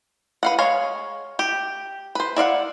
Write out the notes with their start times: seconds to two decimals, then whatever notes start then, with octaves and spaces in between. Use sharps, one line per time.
0.43 B4 F5 F#5
0.58 G#3 C#5 F5
1.39 G4
2.15 B4 C5
2.36 E4 D5 F5 F#5